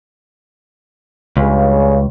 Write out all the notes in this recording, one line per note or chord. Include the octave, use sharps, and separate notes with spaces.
C#2 G2 C#3